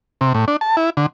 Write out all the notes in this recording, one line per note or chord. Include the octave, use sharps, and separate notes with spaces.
C3
A2
D4
A5
E4
D3